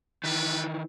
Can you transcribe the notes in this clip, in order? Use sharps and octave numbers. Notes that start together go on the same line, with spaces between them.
D#3 E3 G4 A4 B4